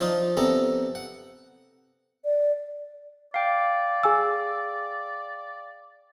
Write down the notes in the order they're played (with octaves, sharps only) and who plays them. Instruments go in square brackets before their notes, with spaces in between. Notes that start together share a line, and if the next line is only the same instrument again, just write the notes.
[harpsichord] F3 D4 D#4 F4
C3 B3 D4 A4 A#5
F#5
[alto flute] D5
[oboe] D5 [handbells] F5 G5
[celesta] G#4 G#5 E6